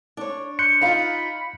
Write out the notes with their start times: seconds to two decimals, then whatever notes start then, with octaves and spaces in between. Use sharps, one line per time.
0.17 D4 C#5
0.59 C6 F#6 G6 C#7
0.81 D#4 F4 F5 A#5 B5